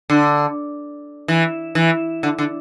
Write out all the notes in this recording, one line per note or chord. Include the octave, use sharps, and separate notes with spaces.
D3
E3
E3
D3
D3